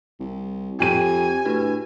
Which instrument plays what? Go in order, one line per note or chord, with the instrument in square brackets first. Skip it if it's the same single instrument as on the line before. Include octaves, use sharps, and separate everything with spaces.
[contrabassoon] C2
[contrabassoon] F2 [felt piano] G4 D#7 [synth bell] G5 [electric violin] G#5
[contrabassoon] A2 [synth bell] D4 F#4 B4